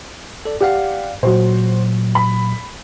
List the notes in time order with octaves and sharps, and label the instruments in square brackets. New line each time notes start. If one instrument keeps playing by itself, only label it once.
[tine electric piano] A4 D5
[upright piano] G4 F#5 [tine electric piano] D5 F5
[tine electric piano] A#2 F#3 [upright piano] F#4 C5
[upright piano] B5